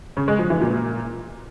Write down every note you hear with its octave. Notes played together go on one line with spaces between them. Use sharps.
C#3
G#3
F3
E3
A#2